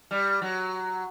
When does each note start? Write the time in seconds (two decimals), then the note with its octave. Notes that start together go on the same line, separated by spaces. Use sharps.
0.11 G3
0.42 F#3